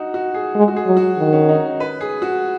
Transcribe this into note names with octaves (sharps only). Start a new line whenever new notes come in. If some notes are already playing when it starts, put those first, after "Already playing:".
Already playing: D#4 F#4
F#4
G#4
G#3
F#4
G#4
F#3
F#4
D#3
C#4
D#4
B4
G#4
F#4